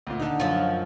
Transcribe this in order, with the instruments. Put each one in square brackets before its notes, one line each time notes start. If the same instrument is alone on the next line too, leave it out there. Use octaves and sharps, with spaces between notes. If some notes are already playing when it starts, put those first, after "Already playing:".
[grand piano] D2 A#2
D3 D#4
[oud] F#2 F3